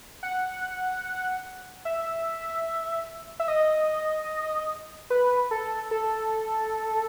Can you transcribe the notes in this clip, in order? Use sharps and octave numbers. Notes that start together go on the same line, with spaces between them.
F#5
E5
E5
D#5
B4
A4
A4